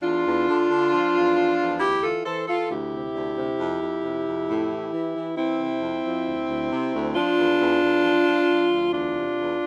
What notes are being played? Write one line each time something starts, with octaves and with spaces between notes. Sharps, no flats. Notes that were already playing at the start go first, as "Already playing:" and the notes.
E2 D4 F4
E2
D3
D3
F3
E2
F3
E2
D2 E4 G4
E3 F4 A4
E3 A4 C5
E3 F4 A4
D2 E4 G4
C3
D2
C3
F2
F2
C3
F2
A2
E3
E3
E3
E3 C4 E4
C3
F2
F2
D2
D2
C3
D2
F3 D4 F4
E2
E2
E2
F3
F3
F3
D2
E2 D4 F4
C3
E2